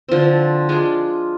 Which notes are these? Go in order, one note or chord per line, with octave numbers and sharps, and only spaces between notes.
D3 F3 C4
G#3 D4 F4 G#4